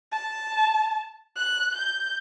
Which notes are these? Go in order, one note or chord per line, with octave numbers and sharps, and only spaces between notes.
A5
F#6
G6